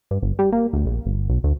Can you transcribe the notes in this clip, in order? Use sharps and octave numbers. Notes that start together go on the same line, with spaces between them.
G2
G1
G3
A#3
D2
A#1
G1
B1
D2